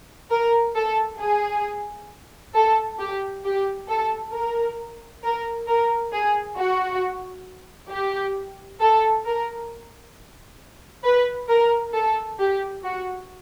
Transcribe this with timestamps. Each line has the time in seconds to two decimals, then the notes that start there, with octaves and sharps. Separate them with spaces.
0.31 A#4
0.76 A4
1.20 G#4
2.55 A4
3.00 G4
3.45 G4
3.89 A4
4.34 A#4
5.24 A#4
5.68 A#4
6.13 G#4
6.57 F#4
7.91 G4
8.81 A4
9.26 A#4
11.05 B4
11.50 A#4
11.95 A4
12.40 G4
12.84 F#4